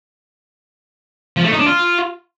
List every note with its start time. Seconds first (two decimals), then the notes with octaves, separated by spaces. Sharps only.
1.37 F3
1.44 A3
1.52 D#4
1.59 D4
1.66 F4